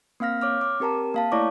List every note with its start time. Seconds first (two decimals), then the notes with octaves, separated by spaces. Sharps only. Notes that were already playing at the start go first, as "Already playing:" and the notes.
0.20 A#3 C4 F5 F6 A#6
0.41 C#5 D6 F6
0.61 D6
0.80 C4 G4 A#4 A5 A#5
1.14 A#3 F5 A5
1.32 A3 E4 C#5 D5 C#6 D6